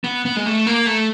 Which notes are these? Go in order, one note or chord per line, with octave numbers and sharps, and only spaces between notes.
B3
B3
G#3
A3
A#3
A3